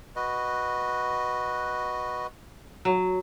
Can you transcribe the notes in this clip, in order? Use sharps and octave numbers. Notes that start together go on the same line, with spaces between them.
F#4 B4 D#5
F#3